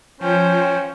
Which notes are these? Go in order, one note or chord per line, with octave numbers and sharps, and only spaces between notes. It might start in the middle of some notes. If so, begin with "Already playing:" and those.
F3 C#4 C5 G5